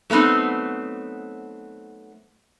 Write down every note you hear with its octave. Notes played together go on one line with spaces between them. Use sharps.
F#3 A3 B3 C4 D#4